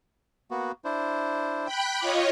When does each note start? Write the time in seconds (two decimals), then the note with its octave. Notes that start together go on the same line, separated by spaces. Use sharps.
0.51 A#3 B3 F#4
0.85 D4 E4 C5
1.64 G5 B5 F#6
2.01 F4 C#5 D#5 D6